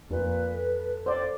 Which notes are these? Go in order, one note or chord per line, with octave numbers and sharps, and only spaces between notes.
F2 A#2 B4
A4
C5 D5